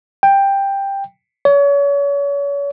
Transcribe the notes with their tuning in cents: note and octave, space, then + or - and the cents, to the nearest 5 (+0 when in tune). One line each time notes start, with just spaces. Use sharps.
G5 +10
C#5 +35